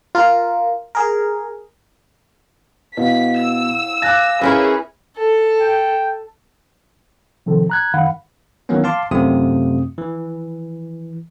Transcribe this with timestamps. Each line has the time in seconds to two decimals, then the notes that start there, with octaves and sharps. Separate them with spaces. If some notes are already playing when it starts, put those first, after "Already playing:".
0.15 F4 A#4
0.95 G#4 A#4
2.97 B2 E4 F5 F#5 B6
3.38 E6
4.02 F5 G#5 D6 F#6 A6 A#6
4.41 C#4 E4 G#4 A#4 B4 E5
5.17 A4
5.61 G5
7.46 C3 D#3 F3 A4
7.70 A#5 F#6 G#6
7.94 F#2 D#3 F5 F#5 B5
8.69 D#3 E3 F#3 A#3 B3 C#4
8.84 F5 A5 C6 D6
9.11 F#2 C3 A3 C4 F4 D#6
9.98 E3